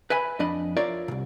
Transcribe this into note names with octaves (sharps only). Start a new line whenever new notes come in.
B4 E5 G#5 B5
F2 D4 D#5 B5
F4 A#4 C#5 D5 E5
C2 A#2